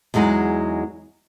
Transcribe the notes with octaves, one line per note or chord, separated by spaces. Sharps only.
E2 F#3 G#3 D#4 F#5